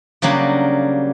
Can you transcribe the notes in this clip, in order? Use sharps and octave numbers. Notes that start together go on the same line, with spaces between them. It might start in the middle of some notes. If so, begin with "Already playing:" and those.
C#3 F#3 G3 A#3 D4